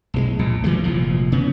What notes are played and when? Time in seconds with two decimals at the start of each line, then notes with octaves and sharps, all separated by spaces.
0.14 B1 E3 G#3
0.39 A#1 A#2
0.64 D#3 E3 F#3 A3
0.84 F1 A#2 F3
1.32 C#3 B3